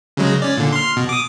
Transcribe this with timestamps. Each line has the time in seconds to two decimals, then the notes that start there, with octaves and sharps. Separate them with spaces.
0.17 C#3 F#3 G#3
0.42 C#4 D5
0.57 A#2 D3
0.72 C6 F6
0.96 B2
1.09 D6 D#6